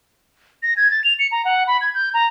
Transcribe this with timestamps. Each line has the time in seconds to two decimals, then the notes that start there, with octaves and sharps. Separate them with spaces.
0.63 A#6
0.77 G#6
0.91 A6
1.04 F7
1.19 C#7
1.32 A#5
1.45 F#5
1.67 B5
1.81 G#6
1.94 G6
2.14 A#5